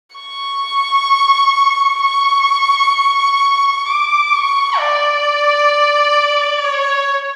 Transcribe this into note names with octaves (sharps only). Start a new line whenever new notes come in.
C#6
C#6
D6
C#6
D5
C#5